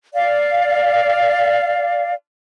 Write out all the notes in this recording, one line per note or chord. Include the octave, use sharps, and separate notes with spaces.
D5 F5